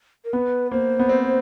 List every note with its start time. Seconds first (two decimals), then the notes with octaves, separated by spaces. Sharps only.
0.25 A#4
0.33 B3 B4
0.71 A#3 C5
0.99 B3
1.09 C4